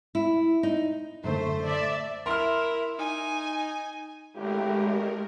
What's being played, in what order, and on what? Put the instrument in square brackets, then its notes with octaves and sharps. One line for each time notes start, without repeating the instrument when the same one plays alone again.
[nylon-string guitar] E4
D#4
[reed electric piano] F#2 A2 D3 [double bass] A3 [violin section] C5
[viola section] D5 E5
[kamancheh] E4 [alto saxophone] A#4 [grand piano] C6 F6
[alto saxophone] D#4 [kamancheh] G#5
[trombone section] G#1 D3 E4 [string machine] G#3 A3 A#4 [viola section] G4